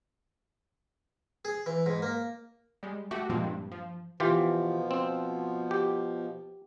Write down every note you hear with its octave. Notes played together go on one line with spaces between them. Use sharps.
G#4
E3
G#2
A#3
G3 G#3
A3 F#4 G4
G2 A#2 F3 G#3 A#3 C4
G2
F3
B2 E3 F3 F4 G4
C4
G4